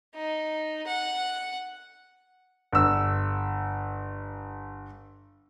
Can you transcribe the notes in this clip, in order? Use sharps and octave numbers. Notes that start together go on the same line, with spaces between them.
D#4
F#5
G1 E6